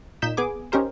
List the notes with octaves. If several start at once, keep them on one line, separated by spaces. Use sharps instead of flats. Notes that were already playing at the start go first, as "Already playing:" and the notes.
A#2 D#4 G6 B6 E7
B3 G#4 G#5 D6
C#4 D#4 G4 A#4 C5